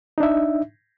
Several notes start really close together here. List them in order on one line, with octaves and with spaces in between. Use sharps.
D#4 D4 E5